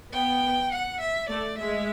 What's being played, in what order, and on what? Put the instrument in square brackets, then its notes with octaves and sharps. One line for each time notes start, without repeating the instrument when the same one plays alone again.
[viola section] B3 [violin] G5
[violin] F#5
E5
[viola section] A3 [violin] D5
[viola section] G#3 [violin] E5